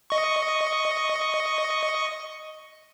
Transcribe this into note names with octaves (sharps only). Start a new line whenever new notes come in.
D#5 C#6